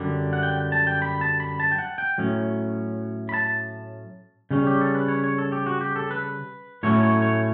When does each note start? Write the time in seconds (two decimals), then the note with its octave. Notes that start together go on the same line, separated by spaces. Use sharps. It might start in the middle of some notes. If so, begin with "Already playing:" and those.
Already playing: F#2 D3 G3
0.33 F#5
0.43 G5
0.72 A5
0.87 G5
1.02 B5
1.21 A5
1.40 B5
1.60 A5
1.72 G5
1.78 F#5
1.98 G5
2.18 A2 F#3 C#4
3.29 B5
3.34 A5
4.51 C#3 G3 C#4
4.67 G4
4.81 A4
4.95 B4
5.08 C#5
5.24 C#5
5.38 A4
5.52 G4
5.66 F#4
5.81 G4
5.96 A4
6.11 B4
6.83 A2 F#3 A3 C#4 E4 C#5
7.03 C#5
7.22 C#5